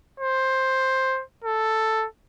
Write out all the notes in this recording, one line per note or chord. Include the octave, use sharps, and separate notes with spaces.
C5
A4